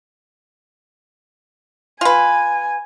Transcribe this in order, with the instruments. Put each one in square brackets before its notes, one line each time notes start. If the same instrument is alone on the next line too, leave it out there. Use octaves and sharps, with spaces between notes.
[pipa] F4 B4 [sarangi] G#5